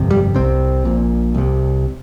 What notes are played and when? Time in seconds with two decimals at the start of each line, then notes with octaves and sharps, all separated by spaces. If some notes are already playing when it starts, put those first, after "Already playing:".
Already playing: G1 F2 C3
0.11 G3
0.35 C2 C3 C4
0.85 A#1 A#2
1.34 C2 C3